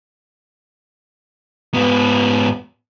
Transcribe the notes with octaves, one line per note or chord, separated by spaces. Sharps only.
G#2 B3